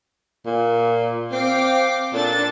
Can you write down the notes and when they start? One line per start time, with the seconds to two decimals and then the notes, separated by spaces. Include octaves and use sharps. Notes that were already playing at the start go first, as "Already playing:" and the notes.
0.46 A#2
1.32 C4 F5 G5 D6
2.13 A#2 D4 A4 A6